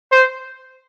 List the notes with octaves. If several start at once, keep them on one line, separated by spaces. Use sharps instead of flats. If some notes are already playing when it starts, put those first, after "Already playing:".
C5